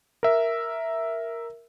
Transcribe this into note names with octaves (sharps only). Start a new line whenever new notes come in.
A#4 E5